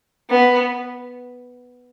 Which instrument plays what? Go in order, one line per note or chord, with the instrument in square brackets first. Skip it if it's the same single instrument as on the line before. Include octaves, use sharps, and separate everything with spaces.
[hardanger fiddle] B3